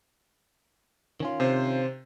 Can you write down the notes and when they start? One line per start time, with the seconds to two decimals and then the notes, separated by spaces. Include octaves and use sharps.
1.20 D#3 C#4 F4
1.40 C3 C5